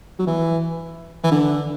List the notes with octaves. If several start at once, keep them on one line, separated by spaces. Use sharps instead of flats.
F#3
E3
E3
D3